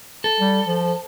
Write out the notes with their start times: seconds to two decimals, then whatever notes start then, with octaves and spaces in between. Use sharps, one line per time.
0.24 A4
0.40 G3
0.67 F3